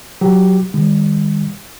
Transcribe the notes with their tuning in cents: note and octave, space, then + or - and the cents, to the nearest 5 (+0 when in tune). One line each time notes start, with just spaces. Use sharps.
F#3 +0 G4 +0
D#3 +0 G3 +45